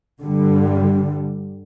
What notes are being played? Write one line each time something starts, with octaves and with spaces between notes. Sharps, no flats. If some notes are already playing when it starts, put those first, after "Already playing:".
G2 D3 G3